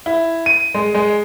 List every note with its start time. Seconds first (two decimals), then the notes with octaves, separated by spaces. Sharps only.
0.06 E4
0.46 D#7
0.74 G#3
0.94 G#3